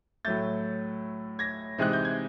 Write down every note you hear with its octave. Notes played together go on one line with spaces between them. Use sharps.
A2 F#3 A3 G6 A6
G#6 A#6
C3 E3 G#3 C4 D#4 F#6
G6
G#6